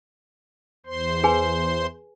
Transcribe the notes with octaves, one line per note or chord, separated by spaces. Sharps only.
E2 C5 C6
G#4 B4 G#5